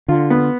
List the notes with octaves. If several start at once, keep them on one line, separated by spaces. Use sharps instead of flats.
D3 F4
B3